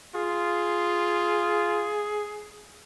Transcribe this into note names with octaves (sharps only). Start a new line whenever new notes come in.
F4 G#4